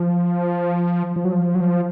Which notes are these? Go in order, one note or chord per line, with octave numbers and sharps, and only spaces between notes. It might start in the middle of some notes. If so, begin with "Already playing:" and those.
Already playing: F3
F3
F#3
F3
F#3
F3